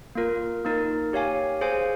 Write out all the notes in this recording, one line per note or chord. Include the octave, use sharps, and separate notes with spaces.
A#3 F4 A#4
A#3 D#4 A#4
G4 C#5 F5 G#5
G#4 C5 F5 G#5